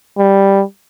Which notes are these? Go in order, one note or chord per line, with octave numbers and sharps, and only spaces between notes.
G3